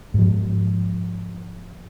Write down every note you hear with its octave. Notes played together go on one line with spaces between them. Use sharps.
G#2 F3